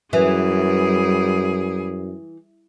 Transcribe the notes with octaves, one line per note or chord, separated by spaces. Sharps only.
F#2 E3 G3 G#4